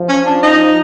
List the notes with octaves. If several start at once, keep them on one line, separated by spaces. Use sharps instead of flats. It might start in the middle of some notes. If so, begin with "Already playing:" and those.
Already playing: F3
C#4
D4
D#4